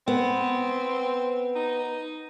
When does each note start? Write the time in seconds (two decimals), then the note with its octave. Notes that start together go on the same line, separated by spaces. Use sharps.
0.08 B3 C4
1.56 D#4